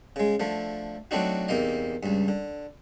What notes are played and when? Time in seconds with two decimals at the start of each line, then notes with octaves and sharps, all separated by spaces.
0.16 C#3 G#3
0.40 D3 F3 A3
1.11 F#3 A3 C4 D4 D#4 F#4
1.48 E2 C3 A#3 D#4 D#5
2.03 C#2 G2
2.28 D3